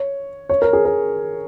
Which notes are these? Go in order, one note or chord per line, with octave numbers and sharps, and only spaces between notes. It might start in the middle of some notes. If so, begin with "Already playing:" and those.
Already playing: C#5
C#5
A#4
G#4
A#4